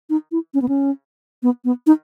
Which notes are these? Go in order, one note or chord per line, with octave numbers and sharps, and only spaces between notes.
D#4
E4
C#4
B3
C#4
B3
B3
D#4